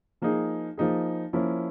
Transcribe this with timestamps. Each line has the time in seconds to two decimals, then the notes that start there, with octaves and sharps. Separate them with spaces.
0.22 F3 A#3 D#4 G#4
0.78 F3 A#3 D#4 G#4
1.33 F3 A#3 C#4 E4